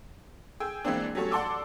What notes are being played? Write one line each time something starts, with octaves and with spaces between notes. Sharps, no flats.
G#4 G5 E6
E3 G#3 A#3 C4 D4
F#3 G3 A3 C#4 A4 C#5
D5 F#5 A5 C6 D6 E6